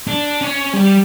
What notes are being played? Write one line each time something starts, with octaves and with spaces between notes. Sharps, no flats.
D4
C#4
G3